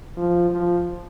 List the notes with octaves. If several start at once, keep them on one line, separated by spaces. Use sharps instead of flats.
F3
F3